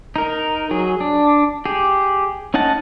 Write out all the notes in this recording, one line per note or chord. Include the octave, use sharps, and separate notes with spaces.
D#4 A#4
F#3 G#4
D4
G4 G#4
C#4 D#4 D#5 F#5 A5